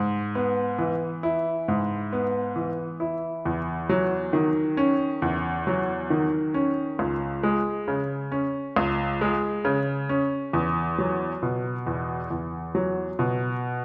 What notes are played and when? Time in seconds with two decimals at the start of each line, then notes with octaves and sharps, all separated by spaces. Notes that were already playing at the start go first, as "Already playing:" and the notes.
Already playing: G#2
0.35 B3
0.78 E3
1.23 E4
1.68 G#2
2.13 B3
2.56 E3
3.00 E4
3.45 E2
3.89 F#3
4.33 D#3
4.77 C#4
5.22 E2
5.67 F#3
6.10 D#3
6.54 C#4
6.99 C#2
7.43 G#3
7.88 C#3
8.32 C#4
8.76 C#2
9.21 G#3
9.65 C#3
10.09 C#4
10.53 E2
10.98 F#3
11.43 B2
11.86 E2
12.31 E2
12.75 F#3
13.19 B2